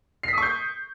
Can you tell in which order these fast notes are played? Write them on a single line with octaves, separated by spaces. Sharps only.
C7 B6 D#6 C#6 G6